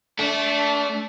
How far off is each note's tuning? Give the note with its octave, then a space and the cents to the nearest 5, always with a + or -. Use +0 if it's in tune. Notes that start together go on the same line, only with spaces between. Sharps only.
A3 -10 D4 -30